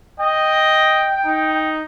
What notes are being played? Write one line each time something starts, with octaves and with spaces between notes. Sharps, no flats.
D#5 G5
D#4